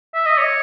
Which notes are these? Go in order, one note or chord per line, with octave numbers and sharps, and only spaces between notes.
E5
D#5
C#5